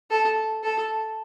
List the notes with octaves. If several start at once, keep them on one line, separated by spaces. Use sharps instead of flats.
A4
A4